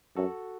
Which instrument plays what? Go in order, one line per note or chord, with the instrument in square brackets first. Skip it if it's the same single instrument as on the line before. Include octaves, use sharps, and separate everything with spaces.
[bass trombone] F#2 [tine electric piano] F#4 A4